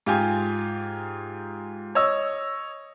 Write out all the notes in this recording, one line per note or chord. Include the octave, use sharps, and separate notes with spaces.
G#2 F4 G4 G#5
C#5 D#5 E6